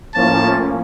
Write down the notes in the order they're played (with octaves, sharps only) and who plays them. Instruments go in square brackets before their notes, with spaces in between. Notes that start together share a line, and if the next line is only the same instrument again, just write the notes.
[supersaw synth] A2 F3 A#3 C#4 [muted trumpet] A5